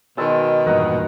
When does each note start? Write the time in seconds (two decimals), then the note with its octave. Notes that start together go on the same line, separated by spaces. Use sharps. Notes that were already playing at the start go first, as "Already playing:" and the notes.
0.18 B2 D#3 G#3 A5 E6
0.66 E2 G2 A#2 A#4 D#5 F#5